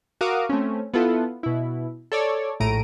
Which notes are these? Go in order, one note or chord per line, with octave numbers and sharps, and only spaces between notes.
F#4 A#4 F5 D6 D#6
A3 C4 C#4
B3 E4 F4 A4
B2 E4
A4 C#5 D5
A#1 A2 A3 A#5 D7 D#7